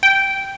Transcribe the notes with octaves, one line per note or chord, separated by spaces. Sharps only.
G5